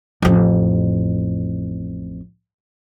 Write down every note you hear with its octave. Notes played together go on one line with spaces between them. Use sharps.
A1 F2